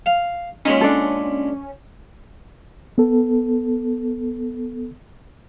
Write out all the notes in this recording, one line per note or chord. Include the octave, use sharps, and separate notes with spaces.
F5
A#2 G#3 C#4 D#4
D4 A4
B3 A4